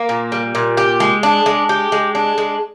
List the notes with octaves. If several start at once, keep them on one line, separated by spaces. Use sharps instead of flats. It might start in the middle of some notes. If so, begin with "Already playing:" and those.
Already playing: A#3
A#2
G3
A#2
G4
G#3
D4
G#3
G4
G#3
D4
G#3